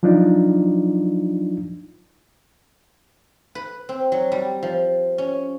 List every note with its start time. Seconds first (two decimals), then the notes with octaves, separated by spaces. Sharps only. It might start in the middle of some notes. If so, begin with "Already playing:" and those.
0.03 F3 F#3 D4 D#4 F4
3.55 B4
3.89 C4
4.12 F#3
4.32 G3
4.63 F3
5.18 C#4